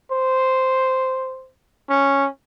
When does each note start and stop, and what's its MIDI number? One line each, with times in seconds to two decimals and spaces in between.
0.12 1.50 72
1.89 2.27 61